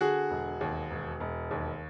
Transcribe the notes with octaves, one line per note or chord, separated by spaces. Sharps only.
D3 F#4 G#4
E1
D#2
E1
E1
D#2